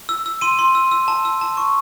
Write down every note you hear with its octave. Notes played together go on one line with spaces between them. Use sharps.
E6
E6
C6 D#7
C6
E6
E6
A5
E6
A5
C#6